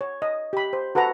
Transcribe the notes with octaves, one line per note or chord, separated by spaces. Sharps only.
C#5
D#5
G4 B5
C5
F#4 A4 B4 F#5 A#5